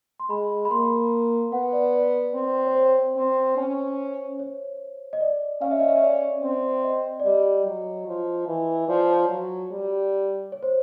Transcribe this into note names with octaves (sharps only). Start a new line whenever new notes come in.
C6
G#3 B5
B5
A#3 C6
B3 F#5
D5
D5
C4
C#5
C5
C4
C#4
C#5
D#5
D5
C#4 F5
E5
D#5
E5
D5
C4
D#5
D5
G3 D#5
F#3
F3
E3
F3 D5
C#5
F#3
G3
C#5
C5